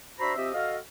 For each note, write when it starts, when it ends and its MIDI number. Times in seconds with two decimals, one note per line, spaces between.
0.19 0.36 62
0.19 0.36 66
0.19 0.36 72
0.19 0.36 76
0.19 0.36 82
0.19 0.36 83
0.36 0.51 53
0.36 0.51 60
0.36 0.51 67
0.36 0.51 75
0.36 0.51 76
0.54 0.77 66
0.54 0.77 69
0.54 0.77 75
0.54 0.77 77